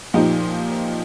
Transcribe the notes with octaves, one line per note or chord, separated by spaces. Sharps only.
A#2 F3 D#4 G4